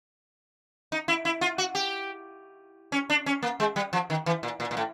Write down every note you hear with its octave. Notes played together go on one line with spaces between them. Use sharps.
D#4
E4
E4
F4
F#4
G4
C#4
D4
C#4
A#3
G#3
G3
F3
D#3
E3
A#2
A#2
A#2
A2